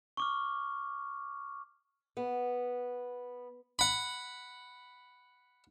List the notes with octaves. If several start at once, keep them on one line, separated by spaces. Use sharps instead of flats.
C#6 D6 F6
B3
F#5 B5